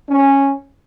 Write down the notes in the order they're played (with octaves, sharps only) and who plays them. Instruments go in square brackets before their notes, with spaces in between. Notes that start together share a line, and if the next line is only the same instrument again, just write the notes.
[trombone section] C#4